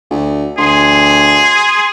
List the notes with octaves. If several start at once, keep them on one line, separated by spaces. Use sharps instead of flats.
D2
D2 G#4 C6